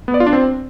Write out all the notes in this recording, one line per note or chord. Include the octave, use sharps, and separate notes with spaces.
B3
D5
F4
D4
C4